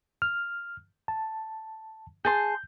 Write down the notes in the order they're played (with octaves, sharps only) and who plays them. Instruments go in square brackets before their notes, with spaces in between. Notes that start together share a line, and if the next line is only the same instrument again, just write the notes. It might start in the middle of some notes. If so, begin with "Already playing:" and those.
[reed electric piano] F6
A5
[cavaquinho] G#4 A5 C6 [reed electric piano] G6